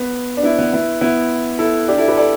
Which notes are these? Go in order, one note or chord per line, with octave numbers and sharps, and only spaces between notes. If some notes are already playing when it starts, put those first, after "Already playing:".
Already playing: B3
D4
B3 E4
B3
B3 E4
B3 E4
E4 A4
D4 G4
E4 A4
G4 B4
A4 D5